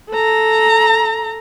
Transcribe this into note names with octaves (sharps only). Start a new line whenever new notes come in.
A4 A#5